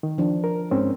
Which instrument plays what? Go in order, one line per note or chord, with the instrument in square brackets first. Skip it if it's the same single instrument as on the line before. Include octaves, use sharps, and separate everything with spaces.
[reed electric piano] D#3
[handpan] F3 D4
[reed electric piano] A#4
G#2 C4 C#4